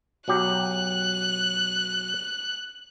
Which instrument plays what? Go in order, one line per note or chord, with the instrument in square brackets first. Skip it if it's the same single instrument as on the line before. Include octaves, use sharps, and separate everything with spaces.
[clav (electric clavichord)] B1 F#3 G4 [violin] F#6